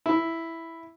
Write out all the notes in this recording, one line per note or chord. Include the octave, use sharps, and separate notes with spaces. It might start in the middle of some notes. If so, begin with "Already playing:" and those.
E4